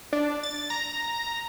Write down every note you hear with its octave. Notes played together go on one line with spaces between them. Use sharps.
D4
A6
A#5